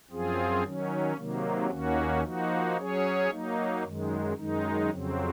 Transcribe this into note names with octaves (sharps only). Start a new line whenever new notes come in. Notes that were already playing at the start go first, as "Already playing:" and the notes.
F#2 F3 C4 F4 G#4
D#3 F#3 C#4
C3 D#3 F#3 A#3
D#2 D#3 A#3 C#4 F#4
F3 A#3 D#4 F#4
F#3 C#4 G#4 C#5
F#3 A#3 D#4
F#2 D#3 G#3
F#2 D#3 G#3 D#4
F2 C#3 F#3 C4